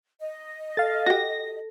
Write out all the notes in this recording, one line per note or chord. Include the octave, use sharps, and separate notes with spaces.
D#5
A4 F5 A6
F#4 G4 A#6